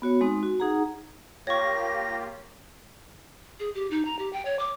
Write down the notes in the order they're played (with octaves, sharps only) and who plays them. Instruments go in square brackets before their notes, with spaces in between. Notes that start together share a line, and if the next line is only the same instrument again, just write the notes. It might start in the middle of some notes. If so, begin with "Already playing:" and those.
[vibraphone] B3 F#4 C#5
G#3 C4 D#4
F#4
D#4 G#4 F#5 A#5
[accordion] A#3 F4 G4 [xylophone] C#5 C#6 [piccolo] A#6
[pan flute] G#4
G4
D#4
A#5
G4
G5
C#5
D6